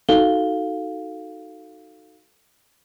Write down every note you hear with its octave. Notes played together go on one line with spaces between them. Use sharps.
D#4 F#4 A4 F5 G7